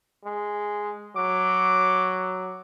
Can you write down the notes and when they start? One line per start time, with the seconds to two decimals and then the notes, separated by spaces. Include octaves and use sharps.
0.25 G#3
1.16 F#3 D6